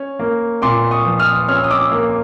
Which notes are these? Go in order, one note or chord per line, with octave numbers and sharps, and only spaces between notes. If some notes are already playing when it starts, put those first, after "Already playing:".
Already playing: C#4
A#3
A#2 C6 D6
C#6 D#6
F3
D#6 F6
C#4 F6
E6
D#6
D6 E6
A#3